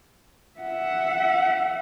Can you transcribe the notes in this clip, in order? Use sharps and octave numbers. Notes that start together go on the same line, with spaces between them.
E5 F#5